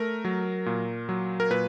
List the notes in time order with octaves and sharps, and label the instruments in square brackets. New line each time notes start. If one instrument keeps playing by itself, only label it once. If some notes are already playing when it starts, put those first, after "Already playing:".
Already playing: [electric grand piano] A3 A#4
F#3
A#2
F#3
A#4
A#2 B4